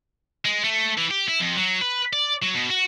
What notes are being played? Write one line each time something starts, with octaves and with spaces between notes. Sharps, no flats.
G#3
A3
E3
G4
E4
F2
F#3
B4
D5
F#3
B2
F#4